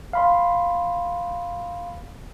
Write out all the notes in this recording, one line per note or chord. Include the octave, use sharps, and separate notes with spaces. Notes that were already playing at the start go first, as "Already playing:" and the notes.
F5 B5 C6